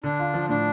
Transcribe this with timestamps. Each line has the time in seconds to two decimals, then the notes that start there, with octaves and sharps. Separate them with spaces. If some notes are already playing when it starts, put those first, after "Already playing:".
0.04 D3 D4
0.19 F4
0.34 F3
0.49 A2 D4